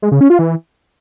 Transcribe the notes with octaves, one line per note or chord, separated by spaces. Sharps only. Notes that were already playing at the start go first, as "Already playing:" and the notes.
G#3
C#3
C#4
F4
E3